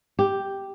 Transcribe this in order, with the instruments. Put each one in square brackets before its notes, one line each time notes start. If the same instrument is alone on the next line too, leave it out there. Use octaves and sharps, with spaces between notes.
[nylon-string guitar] G4